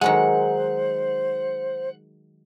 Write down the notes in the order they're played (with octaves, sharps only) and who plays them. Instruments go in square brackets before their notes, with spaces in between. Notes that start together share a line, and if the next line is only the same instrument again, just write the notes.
[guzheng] D#3 F#3 G#3 [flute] C5 [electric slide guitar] F#5